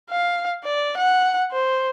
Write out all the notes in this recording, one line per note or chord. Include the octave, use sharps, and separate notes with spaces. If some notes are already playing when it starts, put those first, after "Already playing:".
F5
D5
F#5
C5